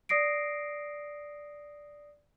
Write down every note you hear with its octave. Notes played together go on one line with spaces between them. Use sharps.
D5 D#6 A#6 C7 D7